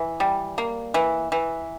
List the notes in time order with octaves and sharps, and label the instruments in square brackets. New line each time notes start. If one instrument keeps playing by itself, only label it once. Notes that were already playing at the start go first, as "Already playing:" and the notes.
Already playing: [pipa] E3
G3
A#3
E3
E3